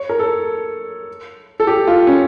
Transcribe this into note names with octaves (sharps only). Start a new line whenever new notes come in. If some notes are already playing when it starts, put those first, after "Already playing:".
Already playing: C#5
A#4
A4
A4
G4
F4
C#4